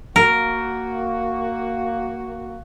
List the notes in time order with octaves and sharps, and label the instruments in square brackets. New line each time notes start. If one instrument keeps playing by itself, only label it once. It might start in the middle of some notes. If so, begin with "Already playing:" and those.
[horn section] A#3 F#4 [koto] A#4